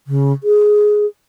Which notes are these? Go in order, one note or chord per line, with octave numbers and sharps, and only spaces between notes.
C#3
G#4